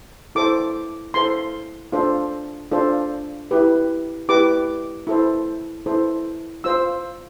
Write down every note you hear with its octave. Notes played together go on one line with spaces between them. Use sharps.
E4 A4 C5 D6
E4 A4 C5 C6
D4 F4 A4 C5
D4 F4 A4 C5
E4 G4 B4
E4 G4 B4 D6
E4 A4 C5
E4 A4 C5
F4 C5 E6